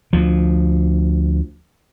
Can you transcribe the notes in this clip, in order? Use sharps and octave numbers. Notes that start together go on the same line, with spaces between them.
D2 F3